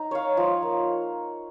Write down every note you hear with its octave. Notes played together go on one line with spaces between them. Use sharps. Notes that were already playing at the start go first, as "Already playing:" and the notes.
Already playing: D#4
C#5 F5
F3
A#3